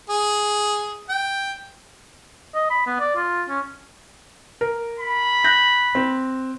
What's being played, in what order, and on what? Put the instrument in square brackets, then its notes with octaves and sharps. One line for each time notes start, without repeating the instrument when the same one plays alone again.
[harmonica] G#4
G5
[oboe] D#5
B5
B3
D5
F4
C#4
[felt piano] A#4
[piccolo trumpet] B5
[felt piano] F#6 G6 A#6
C4